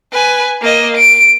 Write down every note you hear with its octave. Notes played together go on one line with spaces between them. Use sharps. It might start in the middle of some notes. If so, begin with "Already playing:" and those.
B4 G#5
A#3 D#5
D7